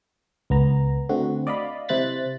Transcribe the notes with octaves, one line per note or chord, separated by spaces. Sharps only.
C#2 B3 A#5
D3 A3 C4 F#4
D5 D#5 F5 B5
C3 E4 C5 F#6 A6 B6